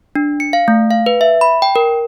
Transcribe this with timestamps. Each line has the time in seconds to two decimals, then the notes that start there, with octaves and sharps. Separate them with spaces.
0.15 D4
0.40 C#7
0.53 F5
0.68 A3
0.91 F5
1.06 B4
1.21 E5
1.41 B5
1.62 G5
1.76 A#4